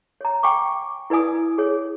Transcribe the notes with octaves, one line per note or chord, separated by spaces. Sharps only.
C#5 A#5
G5 G#5 C#6 D6
E4 B4 D5 G#5 D#6
G#4 C#5